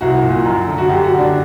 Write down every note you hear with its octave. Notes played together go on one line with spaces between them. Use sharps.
C2 F#4
A#2
F#2
D3
F#4
F#2 G4
F#4
D3
D4